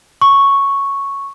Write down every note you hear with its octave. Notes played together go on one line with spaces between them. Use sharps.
C#6